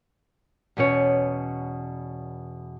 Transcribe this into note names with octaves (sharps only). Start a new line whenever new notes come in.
E2 B2 C#4 C#5